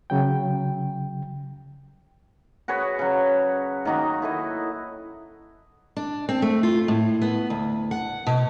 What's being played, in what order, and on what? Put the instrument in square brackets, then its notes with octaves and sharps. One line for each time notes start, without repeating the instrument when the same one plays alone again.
[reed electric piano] C#3 F#3 G5
[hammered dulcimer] F#4 G#4 B4 C#5
C#3 F#3
D#3 A#3 D#4 F#4
E4 A4 D#5
[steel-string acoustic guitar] D4
C4
A3
F4
A2
B3
D2
F#5
B2